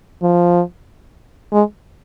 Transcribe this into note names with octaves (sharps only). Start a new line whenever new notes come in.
F3
G#3